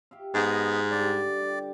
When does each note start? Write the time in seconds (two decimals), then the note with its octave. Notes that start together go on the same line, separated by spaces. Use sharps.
0.11 G4 E5 F5
0.35 G#2 B3 D#5
0.91 D3 G3 D5
1.42 G4